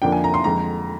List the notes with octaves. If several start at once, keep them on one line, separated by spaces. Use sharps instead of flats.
F2 D3 F3 A#3 D4 G5
G#5
A#5
C6
F2 D3 G#3 A#5